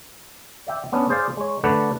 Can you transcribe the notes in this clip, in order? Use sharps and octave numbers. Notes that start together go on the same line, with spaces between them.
D5 E5 G5
B3 C#4 D4
G#4 C5 D5 F5
G#3 C#5
D3 A3 D4 B4 D5 F#5